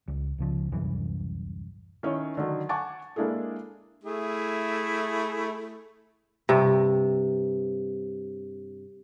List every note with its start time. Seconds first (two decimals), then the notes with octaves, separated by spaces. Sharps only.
0.08 C#2
0.38 C#2 C#3 F3
0.72 D1 C2 F#2 E3
2.03 D#3 C#4 E4 C#5
2.37 D3 D#3 F#3
2.69 F#5 G#5 A5 C#6 D6 A6
3.16 G#3 A#3 D4 E4 G#4 A4
4.04 A3 E4 G#4
6.49 G2 C3